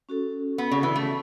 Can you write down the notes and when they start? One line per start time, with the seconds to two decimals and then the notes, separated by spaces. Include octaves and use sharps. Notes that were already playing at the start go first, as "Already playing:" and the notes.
0.09 C#4 F#4 A4
0.58 B3
0.71 C#3
0.83 E3
0.95 A3